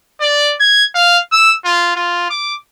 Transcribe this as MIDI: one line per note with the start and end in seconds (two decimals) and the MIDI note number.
0.21 0.55 74
0.60 0.85 92
0.95 1.18 77
1.33 1.53 88
1.65 1.91 65
1.96 2.26 65
2.30 2.55 86